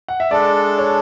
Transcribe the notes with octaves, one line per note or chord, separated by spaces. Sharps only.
F#5
E5
G#3 D4 A4 D5
C#5